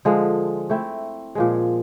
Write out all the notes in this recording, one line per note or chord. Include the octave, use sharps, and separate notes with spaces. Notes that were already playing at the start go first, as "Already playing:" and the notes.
D3 F3 G#3
A3 C4 E4
A#2 F3 G#3